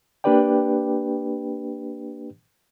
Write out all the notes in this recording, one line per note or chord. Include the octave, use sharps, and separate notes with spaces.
A#3 D4 G4 B4 D5 G5